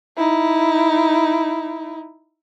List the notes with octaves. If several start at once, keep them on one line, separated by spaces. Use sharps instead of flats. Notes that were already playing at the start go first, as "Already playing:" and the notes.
D#4 E4